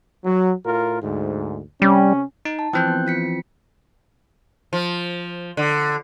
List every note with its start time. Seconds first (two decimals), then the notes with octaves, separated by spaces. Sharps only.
0.25 F#3
0.65 A2 F4 A#4
1.03 D2 G#2
1.82 C3 G3 C#4
2.45 D#4
2.59 A5
2.73 E3 F3 C4 G5 F#6 G6
2.88 B3
3.07 F4 B6 C#7
4.73 F3
5.57 D3